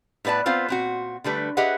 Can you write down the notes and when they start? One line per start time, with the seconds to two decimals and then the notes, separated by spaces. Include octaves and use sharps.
0.25 A2 B3 B4 D5 A5
0.46 B3 C4 F4 C5 F5
0.69 A#2 C4 F#4
1.24 D3 G3 A3 B4
1.57 G4 G#4 B4 D#5 E5 F#5